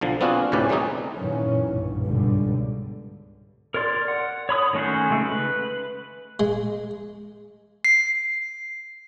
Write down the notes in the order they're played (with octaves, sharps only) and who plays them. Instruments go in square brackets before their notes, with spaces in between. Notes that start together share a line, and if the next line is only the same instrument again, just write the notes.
[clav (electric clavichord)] B1 D3 F3
B3 C4 D4 F4 F#4 G#4
D2 A2 C3 C#4 B4 D5
E3 G3 A3 C4 D#4 G#4
[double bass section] F#2 A#2 D#3 E3 F#3 C#4
B1 G2
C#2 G#2 B2 D3 G3
[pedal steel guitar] A#4 C#5 D5 C6
F#5
C#5 B5 D#6
D#3 A3 C#4 F#4 C5
C#3 G#3 A3
B4
[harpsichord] G#3
[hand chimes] C7